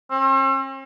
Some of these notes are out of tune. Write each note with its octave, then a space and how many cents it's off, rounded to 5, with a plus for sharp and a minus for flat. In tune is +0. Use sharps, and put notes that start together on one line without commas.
C4 +45